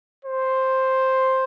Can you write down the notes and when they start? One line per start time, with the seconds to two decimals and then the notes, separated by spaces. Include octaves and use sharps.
0.25 C5